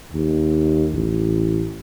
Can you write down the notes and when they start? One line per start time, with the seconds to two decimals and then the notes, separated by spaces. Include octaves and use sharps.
0.13 D#2
0.93 A1